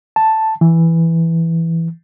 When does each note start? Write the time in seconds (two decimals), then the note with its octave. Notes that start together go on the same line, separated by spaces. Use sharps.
0.16 A5
0.61 E3